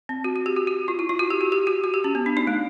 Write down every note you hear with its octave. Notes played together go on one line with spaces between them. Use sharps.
C4
F#4
F#4
G4
F#4
F#4
F4
E4
F4
F#4
G4
F#4
G4
F#4
F#4
G4
C#4
B3
D4
D#4
A3